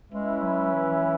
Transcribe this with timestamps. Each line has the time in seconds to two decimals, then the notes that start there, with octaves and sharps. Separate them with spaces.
0.11 G#3 C#4 E4 B4 E5
0.42 F#3
0.74 E3